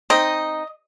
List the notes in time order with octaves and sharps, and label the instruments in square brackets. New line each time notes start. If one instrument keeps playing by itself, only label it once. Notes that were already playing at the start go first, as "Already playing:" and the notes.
[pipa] C4 D#4 [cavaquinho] D#5